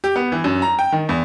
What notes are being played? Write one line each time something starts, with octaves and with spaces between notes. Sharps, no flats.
G4
B3
E3
F#2
A#5
G5
D#3
E2